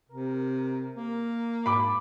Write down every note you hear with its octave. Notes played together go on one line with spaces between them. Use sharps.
C3 A#4
A#3
G#2 A5 B5 D6